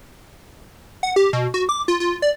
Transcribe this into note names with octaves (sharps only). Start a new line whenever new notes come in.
F#5
G4
B2
F#4
D6
F4
F4
D5